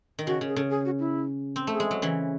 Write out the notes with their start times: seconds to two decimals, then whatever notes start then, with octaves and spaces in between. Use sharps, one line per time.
0.19 D#3
0.27 C#3 F#4
0.41 C#3
0.48 G#4
0.56 C#3 A4
0.70 G#4
0.85 F#4
0.99 E4
1.56 C4
1.67 A3
1.73 G#4
1.80 G#3
1.91 F#3
2.02 C#3 E3